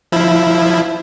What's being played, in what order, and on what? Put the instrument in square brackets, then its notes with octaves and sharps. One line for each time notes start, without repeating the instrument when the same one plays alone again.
[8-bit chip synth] F3 E4